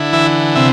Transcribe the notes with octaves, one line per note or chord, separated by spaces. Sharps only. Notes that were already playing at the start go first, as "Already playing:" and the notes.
Already playing: D3 E4
E3 E5
C3 E5